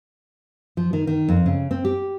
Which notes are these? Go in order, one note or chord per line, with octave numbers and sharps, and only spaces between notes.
F3
D#3
D#3
F2
C#3
C4
G4